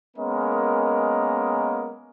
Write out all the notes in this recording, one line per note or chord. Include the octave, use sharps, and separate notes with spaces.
G#3 A#3 B3 C#4 A#4 D#5